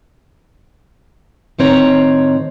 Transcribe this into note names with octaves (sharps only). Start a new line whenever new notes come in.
A2 D#3 C4 C#5 E5 A#5